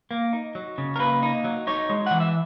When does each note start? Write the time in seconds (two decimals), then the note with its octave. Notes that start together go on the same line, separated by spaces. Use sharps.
0.11 A#3
0.33 D#4
0.55 F#3
0.78 C#3
0.96 A#4
0.99 A#3 B4
1.23 D#4
1.44 F#3
1.67 D#4 C#5
1.90 G#3
2.06 E3 F#5
2.20 E5